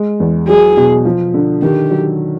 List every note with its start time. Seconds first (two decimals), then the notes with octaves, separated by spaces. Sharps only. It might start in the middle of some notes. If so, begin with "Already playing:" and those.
Already playing: G#3
0.20 E2
0.48 F#3 G#4
0.77 B2
1.05 F3
1.34 D3
1.62 D#3 G4
1.91 F#3